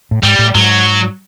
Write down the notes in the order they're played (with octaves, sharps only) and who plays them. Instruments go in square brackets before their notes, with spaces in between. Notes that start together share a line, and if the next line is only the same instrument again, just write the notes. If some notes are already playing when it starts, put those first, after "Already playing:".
[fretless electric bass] A2
[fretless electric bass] G#2 [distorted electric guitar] G3
[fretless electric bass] A2
[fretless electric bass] G#2 [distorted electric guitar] F#3